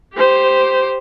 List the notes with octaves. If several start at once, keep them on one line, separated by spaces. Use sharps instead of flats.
G4 C5